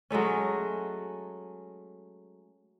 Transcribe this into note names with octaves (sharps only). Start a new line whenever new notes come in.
F#3 G#3 A3 C#4